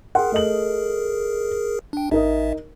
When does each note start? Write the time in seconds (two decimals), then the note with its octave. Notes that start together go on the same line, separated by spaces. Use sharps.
0.15 G#4 A#4 F#5 G5 C6
0.32 A3 D#5 F#7
1.93 D4 G5
2.11 A1 D#4 A#4 D#5 E5